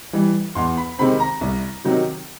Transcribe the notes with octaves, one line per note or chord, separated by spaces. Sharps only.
E3 G3
E2 C6
B5
C3 D#3 G#3 C4 B5
A#5
C2
C3 D#3 F#3